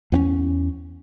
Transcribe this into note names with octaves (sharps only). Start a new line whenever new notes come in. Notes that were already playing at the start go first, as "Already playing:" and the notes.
E2 B3 C#4